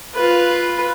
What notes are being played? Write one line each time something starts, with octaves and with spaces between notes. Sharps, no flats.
F4 B4